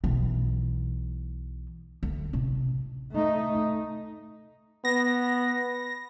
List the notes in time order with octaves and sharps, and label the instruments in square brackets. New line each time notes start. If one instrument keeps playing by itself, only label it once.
[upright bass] B1 E3
D2
A1 C3
[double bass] A3 D#4
[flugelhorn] B3 [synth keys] A#6